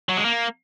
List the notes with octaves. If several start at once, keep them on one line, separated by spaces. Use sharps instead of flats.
F#3
G#3
A#3